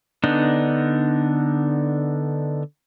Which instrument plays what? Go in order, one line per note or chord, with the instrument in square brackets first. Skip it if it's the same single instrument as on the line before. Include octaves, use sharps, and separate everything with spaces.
[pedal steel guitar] D3 B3 D4 D#4